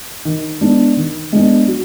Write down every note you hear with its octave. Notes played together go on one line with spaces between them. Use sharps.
D#3
G#3 B3 D4
D#3
G#3 B3 D4
F#3